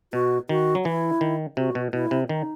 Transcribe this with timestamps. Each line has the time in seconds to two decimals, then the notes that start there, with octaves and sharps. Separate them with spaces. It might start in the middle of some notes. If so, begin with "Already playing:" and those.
0.13 B2 F#4
0.49 D#3 F#4
0.75 F#3
0.85 E3 E4
1.21 D#3
1.57 C3 F#4
1.75 B2
1.93 B2 E4
2.11 C3
2.29 D#3 D#4